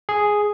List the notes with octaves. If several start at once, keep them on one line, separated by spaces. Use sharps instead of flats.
G#4